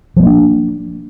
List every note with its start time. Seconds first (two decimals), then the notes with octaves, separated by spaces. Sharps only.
0.16 F3
0.20 G#3
0.23 A#3
0.26 D4